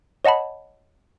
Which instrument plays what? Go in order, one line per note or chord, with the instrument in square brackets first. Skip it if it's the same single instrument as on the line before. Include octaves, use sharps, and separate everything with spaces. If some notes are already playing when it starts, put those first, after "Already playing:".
[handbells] C#5 D#5 F#5 A5 B5